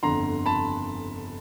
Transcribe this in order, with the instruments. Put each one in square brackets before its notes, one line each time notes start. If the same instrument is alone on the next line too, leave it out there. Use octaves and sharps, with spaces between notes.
[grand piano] G1 F2 D3 A#5 C6
A5 B5